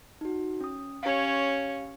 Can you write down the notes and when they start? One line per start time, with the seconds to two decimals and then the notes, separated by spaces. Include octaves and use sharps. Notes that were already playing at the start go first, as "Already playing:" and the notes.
0.21 D#4 F#4
0.61 C#4 D#6
1.03 C#4 G4 C#5 F5